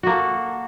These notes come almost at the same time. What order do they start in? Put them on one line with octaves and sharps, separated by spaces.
F#4 A#3 A4